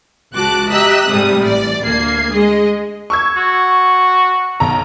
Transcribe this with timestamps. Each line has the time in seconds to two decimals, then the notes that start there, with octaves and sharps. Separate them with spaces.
0.34 C#2 F#4 A5 D6 F#6
0.70 G4 D#5 E5 A#5 E6 F#6
1.09 G#2 C3 G3 A3 D#6
1.41 A1 D5
1.84 D2 A#3 G#6 C7
2.31 G#3 G#4 D#5
3.10 C#6 E6 G#6
3.37 F#4
4.60 B1 A#5